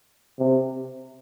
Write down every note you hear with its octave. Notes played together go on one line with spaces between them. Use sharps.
C3